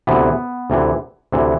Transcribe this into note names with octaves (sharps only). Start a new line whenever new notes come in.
D2 C3 E3 B3
D2 C3 E3
D2 C3 E3